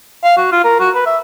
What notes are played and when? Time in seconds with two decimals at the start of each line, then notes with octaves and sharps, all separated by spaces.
0.24 F5
0.37 F#4
0.52 F4
0.64 A#4
0.80 F#4
0.95 B4
1.06 E5